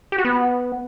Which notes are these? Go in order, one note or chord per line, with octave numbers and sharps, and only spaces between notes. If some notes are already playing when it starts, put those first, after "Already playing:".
G4
F#4
B3